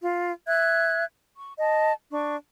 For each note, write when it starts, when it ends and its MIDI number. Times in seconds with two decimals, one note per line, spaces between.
0.01 0.31 65
0.47 1.03 76
0.47 1.03 90
0.47 1.03 92
1.35 1.53 85
1.57 1.92 75
1.57 1.92 81
2.12 2.35 62
2.12 2.35 85